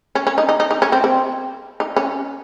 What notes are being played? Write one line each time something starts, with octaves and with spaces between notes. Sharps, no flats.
C#4
C#4
D#4
D#4
D#4
D#4
C#4
C4
C4
D#4
C#4